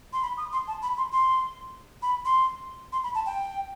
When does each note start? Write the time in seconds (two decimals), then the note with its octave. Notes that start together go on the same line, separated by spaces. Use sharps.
0.13 C6
0.23 B5
0.37 D#6
0.53 C6
0.67 A5
0.83 B5
0.97 C6
1.12 C6
2.02 B5
2.25 C6
2.92 C6
3.04 B5
3.15 A5
3.26 G5